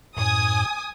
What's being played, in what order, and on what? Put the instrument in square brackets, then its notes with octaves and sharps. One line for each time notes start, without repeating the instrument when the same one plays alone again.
[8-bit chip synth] F#2 A2 [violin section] G#5 D#6